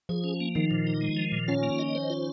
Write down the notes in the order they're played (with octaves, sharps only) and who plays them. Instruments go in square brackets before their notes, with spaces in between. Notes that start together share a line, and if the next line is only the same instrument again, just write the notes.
[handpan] F3 [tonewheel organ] G#4
[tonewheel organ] C#4
A#3
[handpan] D#3 [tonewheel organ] F3
[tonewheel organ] A#2
D#4
G#3
F3
A#2
[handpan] C#4 [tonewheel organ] F4
[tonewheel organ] A#3
D#5
C5
F4